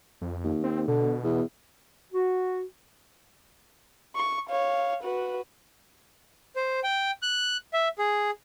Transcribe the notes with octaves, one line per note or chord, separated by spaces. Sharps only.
F2
D#2
C4
B2 D3
E2
F#4
C#6
C#5 F5
F#4 B4
C5
G5
F#6
E5
G#4